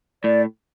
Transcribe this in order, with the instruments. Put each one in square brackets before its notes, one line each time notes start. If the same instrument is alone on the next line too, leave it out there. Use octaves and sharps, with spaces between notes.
[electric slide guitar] A2 [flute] D5